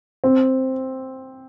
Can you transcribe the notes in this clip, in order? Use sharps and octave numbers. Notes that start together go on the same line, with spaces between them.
C4